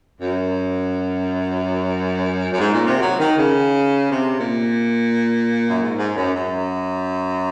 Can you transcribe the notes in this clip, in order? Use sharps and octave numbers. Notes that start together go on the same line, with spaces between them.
F#2
F#2
G#2
A#2
C3
F#3
D#3
C#3
C3
A#2
F#2
G#2
G#2
F#2
F#2